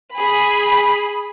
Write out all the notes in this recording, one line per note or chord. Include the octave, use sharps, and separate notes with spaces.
G#4 B5